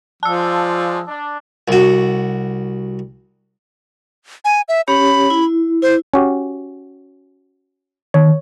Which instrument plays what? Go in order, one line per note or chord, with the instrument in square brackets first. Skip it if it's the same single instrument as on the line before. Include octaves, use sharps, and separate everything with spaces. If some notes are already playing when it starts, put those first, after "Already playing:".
[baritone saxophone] F3 [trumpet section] G#3 F4 D5 [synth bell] A5 E6
[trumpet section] D4
[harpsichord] C2 F#4
[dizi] G#5
E5
[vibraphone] C#4 G4 C#5 [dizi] B5
[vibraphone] E4
[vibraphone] E4 [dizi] C5
[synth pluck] C#4 F#4 G4
[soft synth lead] D#3 [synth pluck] C#5